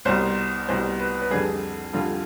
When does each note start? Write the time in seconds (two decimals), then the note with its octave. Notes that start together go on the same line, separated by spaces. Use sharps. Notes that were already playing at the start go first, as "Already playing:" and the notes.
0.05 C2 B2 G3 C5
0.68 C2 B2 G3 C5
1.00 B4
1.22 B4
1.30 F2 D3 G3 G#4
1.93 F2 D3 G3 F4